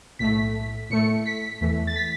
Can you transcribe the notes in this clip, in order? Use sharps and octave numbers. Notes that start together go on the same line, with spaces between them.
B1 A2 A3 B6
A2 A3 C#7
B6
E2 E3 A3
A6
B6